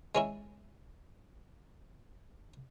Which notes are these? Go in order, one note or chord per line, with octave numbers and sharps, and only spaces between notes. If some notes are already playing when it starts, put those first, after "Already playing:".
G#3 C#4 E4